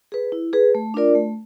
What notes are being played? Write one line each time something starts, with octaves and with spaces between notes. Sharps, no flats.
G#4 B4
E4
G#4 B4
A3
D4 F4 A#4 D5
A3